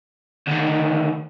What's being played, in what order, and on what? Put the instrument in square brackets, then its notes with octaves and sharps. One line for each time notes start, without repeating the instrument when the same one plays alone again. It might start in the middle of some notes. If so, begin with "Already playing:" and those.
[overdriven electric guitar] D2 D#3